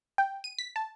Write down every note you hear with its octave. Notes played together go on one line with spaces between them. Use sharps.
G5
D#7
B6
A5